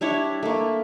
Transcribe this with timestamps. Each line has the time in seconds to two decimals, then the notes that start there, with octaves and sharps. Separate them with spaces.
0.01 G3 D4 E4 C#5
0.43 A3 A#3